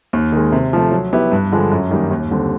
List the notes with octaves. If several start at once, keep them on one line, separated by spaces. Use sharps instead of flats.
D#2
D#3 G#3
C3
F3 A3
F#3
B3 E4 G4
G2
D3 F3 G#3
F#2
D#3 G3 A#3
D#2
D3 G3 C4